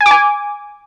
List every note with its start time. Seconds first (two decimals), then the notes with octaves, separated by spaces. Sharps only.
0.01 G#5
0.06 D6
0.11 G#5